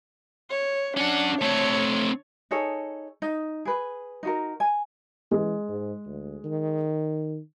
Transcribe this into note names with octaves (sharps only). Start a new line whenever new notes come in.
C#5
C#4 D4 F#5
A3 C4 C#5
D#4 G#4 A4 C#5
D#4
G#4 B4
D#4 F#4 A#4
G#5
E3 G#3
G#2
D2
D#3